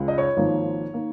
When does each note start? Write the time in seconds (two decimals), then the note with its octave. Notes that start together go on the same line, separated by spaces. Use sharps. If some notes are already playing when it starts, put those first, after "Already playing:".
Already playing: C#2 C#3 G#3
0.08 D#5
0.18 C#5
0.37 G#1 G#2 F3 A#3
0.94 D#3 A#3